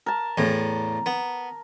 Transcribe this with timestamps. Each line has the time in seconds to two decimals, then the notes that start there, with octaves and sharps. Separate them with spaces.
0.06 A#4 A5
0.38 E2 A2
1.06 B3